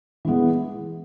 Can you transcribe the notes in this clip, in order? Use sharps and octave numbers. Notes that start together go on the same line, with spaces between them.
E3 G#3 B3